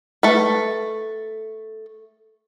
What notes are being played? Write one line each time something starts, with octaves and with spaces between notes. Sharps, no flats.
A3 B4